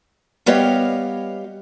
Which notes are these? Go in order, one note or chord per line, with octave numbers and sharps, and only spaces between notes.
G3 B3 G4 C#5 D#5 F5